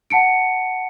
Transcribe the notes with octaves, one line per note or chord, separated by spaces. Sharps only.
F#5 A5 C#7 D7